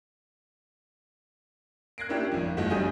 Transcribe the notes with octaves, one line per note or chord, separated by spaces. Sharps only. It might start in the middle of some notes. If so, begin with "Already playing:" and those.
F#6 G#6 A#6 C7 D7
A#3 C#4 D4 E4 F4 G4
G#1 F2
G1 E3 G#3 A3 F#4
B1 G3 D4 G#5 D#6 G6